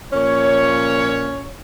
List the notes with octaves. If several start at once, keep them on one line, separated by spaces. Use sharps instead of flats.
A#2 F3 A#3 C#4 C#5